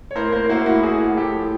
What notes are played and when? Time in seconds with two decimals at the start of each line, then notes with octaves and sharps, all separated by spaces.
0.11 C#5
0.15 A2 A#4 C5
0.32 A#3 A#4 C5
0.49 A#3 E4 F#4
0.66 A2 E4 F#4
0.83 A#3 F#4 G#4
1.00 A2
1.17 A2 G4 A4
1.35 F3